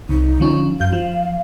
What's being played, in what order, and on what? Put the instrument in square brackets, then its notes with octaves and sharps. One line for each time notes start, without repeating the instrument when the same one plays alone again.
[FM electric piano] C2 C3 [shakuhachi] D#4
[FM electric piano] D3 F3 C#4
[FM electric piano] F#2 G6 [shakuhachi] F5
[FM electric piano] F3